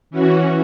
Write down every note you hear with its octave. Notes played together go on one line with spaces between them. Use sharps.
E3 C#4 F#4